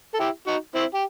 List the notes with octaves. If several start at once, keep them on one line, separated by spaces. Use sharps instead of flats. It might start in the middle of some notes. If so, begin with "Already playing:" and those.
A4
E4 G4
D#4 F#4
C4 E4
G4